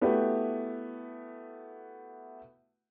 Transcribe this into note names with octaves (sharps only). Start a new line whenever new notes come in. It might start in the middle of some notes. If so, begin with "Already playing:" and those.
A3 B3 E4 F#4 G4 B4